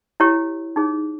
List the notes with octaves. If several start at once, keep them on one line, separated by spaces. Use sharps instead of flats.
E4 G4 C#5
D#4 G#4 C#5